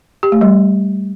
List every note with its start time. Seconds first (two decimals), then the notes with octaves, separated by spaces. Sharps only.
0.23 G4
0.32 A3
0.41 G3